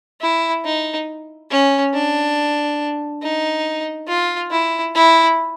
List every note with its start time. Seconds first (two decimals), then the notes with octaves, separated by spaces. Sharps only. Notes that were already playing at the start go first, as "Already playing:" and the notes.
0.21 E4
0.65 D#4
1.50 C#4
1.94 D4
3.22 D#4
4.08 F4
4.51 E4
4.95 E4